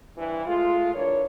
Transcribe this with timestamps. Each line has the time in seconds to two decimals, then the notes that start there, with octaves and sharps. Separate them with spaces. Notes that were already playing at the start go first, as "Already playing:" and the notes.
0.18 G2 C3 E3
0.47 G#3 A3 F4
0.94 E3 D4 A#4 C#5